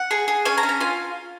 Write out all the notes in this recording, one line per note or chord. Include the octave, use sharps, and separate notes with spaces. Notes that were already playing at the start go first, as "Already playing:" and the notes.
Already playing: F#5
G#4
G#4
C#4 G#5
A#5
C#4
A#5
F4 G#5